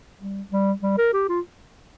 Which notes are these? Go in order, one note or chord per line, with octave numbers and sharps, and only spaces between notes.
G3
G3
G3
A#4
G4
F4